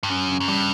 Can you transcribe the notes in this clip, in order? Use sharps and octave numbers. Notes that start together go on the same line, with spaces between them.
G2
F#2 C#4
C#3
F#2
G2 G3